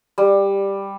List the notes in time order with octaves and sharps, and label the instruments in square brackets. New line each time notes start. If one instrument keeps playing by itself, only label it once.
[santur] G3